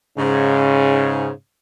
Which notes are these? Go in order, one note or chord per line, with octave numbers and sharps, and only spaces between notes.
G#2 C#3